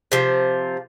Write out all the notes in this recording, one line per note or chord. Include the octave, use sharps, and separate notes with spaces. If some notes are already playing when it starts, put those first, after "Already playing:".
C3 F3